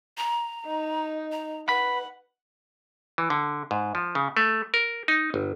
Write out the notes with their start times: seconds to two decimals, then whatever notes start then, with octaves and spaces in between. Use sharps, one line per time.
0.17 A#5
0.66 D#4
1.32 A#5
1.69 B4 F#5 B5
3.18 E3
3.30 D3
3.71 G#2
3.95 F3
4.15 C#3
4.37 A3
4.74 A#4
5.08 D#4
5.34 G1